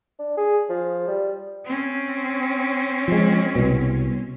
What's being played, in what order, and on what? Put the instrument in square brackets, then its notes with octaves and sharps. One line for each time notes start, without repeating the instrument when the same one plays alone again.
[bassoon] D4
G#4
F3
G3
[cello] C4 C#4
[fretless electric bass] F3 G#3
C2 B2